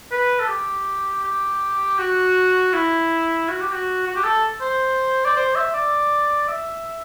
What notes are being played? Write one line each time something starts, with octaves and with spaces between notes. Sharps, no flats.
B4
A4
G4
G4
F#4
E4
F#4
G4
F#4
F#4
G4
A4
C5
D5
C5
E5
D5
E5